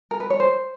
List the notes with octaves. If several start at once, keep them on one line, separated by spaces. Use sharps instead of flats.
A#4
B4
C#5
C5